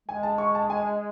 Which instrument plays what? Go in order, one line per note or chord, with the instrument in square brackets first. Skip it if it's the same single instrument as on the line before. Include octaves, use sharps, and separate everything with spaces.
[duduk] G#3 [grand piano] G#5
[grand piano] A5
C#6
A5
G#5